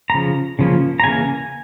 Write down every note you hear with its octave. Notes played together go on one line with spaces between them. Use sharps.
A#5
C#3 F3
C#3 F3 A#3 C#4
A#5
C#3 E3 A#3 G#5